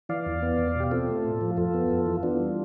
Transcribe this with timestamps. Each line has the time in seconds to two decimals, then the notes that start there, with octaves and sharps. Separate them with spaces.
0.09 E3 D5 F5
0.26 E2
0.42 B3
0.59 E2
0.75 B2 G4
0.91 C4 F4 A4
1.08 A3
1.24 A2
1.41 F3
1.57 F2 F4 A4
1.74 B3
1.90 F2
2.06 E3
2.23 B3 D4 F4
2.40 G3